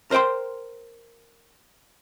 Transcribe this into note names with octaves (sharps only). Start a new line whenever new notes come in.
A#4 C5 D5 G5 C6